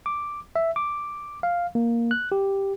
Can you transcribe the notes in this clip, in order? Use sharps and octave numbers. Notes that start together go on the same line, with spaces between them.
D6
E5
D6
F5
A#3
F#6
G4